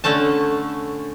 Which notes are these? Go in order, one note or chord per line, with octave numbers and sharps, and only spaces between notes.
D3 A3 C#4 A5